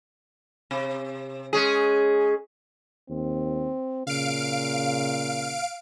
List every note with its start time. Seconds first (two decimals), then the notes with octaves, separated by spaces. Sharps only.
0.71 C3
1.53 G#3 C#4 G#4
3.09 D#2 C4
4.07 A#2 C#3 F5 D7